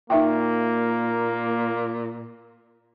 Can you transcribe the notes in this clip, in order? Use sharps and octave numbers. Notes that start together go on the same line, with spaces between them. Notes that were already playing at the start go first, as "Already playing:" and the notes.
A#2 A#3 D#4 E5 G5